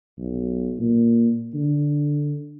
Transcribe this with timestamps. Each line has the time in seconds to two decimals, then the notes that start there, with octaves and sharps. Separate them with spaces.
0.18 B1
0.78 A#2
1.54 D3